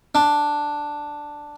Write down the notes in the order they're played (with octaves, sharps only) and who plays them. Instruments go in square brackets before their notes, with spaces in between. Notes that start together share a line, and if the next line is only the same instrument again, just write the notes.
[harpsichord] D4